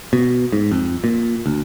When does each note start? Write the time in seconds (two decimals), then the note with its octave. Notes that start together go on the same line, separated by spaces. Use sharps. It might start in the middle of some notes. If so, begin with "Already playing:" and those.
0.13 B2
0.52 G#2
0.71 F2
1.04 A#2
1.46 D2